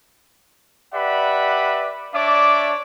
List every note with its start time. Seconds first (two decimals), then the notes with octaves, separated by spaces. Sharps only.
0.94 G4 B4 D5 E5 F#5 B5
2.14 D4 C#5 D5 E5 D6